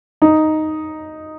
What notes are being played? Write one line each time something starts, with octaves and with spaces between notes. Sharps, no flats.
D#4